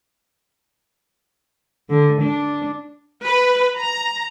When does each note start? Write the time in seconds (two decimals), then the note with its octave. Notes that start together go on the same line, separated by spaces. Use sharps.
1.90 D3
2.21 D4
3.23 B4
3.77 A#5